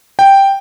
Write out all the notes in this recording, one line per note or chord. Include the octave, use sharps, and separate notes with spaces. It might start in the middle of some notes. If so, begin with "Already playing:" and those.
G5